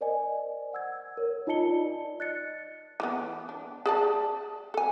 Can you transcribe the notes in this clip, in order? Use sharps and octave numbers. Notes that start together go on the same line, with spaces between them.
A#4 C5 D5 D#5 G#5
F#5 E6 G#6
A#4 C#5
D#4 F4 D#5 A5 C#7 G7
D5
D#5 F#6 A6 C#7
E3 F#3 B3
D4
G#4 D5 A5
A4 G#5